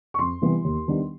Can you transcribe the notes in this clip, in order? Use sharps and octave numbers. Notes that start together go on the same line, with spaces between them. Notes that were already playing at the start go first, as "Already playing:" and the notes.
C#6
F2 C6
C3 E3 G3 B3
D#2
D#3 G3 B3 D4